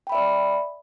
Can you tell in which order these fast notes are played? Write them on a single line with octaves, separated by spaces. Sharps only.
G5 B5 E5 D5